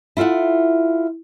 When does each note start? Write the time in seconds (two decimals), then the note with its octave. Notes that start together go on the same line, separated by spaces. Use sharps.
0.17 E4 F4 A4 E5 F#5